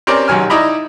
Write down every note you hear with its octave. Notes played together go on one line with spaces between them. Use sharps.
C4 C#4 G4 A#4 D5
G#1 C3 F#3 G#5 F6
D#4 E4 D5 D#5 A#5 B5